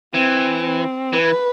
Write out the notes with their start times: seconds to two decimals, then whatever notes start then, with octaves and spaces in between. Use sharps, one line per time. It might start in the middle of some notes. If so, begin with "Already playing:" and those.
0.14 E3 C4
0.64 C4
1.13 E3 B4